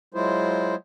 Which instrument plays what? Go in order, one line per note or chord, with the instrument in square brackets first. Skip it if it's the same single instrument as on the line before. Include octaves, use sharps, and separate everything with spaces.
[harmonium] F#3 G#3 E4 F4 C5